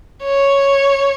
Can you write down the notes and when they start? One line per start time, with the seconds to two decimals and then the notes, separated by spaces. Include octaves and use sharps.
0.24 C#5